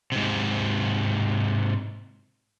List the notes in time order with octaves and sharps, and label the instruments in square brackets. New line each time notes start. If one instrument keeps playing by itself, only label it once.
[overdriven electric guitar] G#2 C3